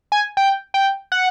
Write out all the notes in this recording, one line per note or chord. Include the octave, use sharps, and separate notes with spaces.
G#5
G5
G5
F#5